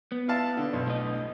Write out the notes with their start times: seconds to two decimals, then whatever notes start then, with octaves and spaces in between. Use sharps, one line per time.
0.12 B3
0.28 E4 F5 A5
0.57 D3
0.73 B1
0.87 A2 D#5